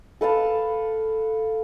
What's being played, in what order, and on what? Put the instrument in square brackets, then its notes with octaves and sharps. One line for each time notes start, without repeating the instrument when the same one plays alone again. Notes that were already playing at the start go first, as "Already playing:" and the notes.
[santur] A4 B4 F5 A5